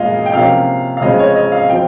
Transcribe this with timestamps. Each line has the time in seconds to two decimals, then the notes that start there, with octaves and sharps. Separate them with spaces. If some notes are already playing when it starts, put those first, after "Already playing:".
Already playing: A#2 G#3 C#4 D#5 F5
0.26 G5
0.34 C3 F3 A#3 C#4 F5
0.97 F5
1.01 C#3 F3 G#3 C4 D#5
1.19 C#5
1.36 D#5
1.52 F5
1.69 F3 C4 G5